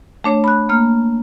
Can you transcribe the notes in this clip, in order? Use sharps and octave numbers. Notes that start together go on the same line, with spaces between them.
A3 D4 C#5
B5 F#6
A#3 F6